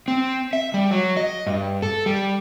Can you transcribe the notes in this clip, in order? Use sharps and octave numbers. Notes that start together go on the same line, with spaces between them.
C4
E5
G3
F#3
D#5
G2
A4
G3